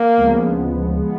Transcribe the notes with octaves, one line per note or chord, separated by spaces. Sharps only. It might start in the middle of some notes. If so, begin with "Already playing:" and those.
Already playing: A#3
D2 C#3 F3 G#3 B3
F3 G#3 B3